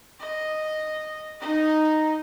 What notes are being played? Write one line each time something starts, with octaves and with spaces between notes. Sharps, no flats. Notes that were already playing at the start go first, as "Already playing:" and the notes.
D#5
D#4 D#5